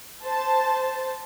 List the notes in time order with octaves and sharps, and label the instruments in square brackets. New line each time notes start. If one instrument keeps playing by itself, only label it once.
[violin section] C5 A5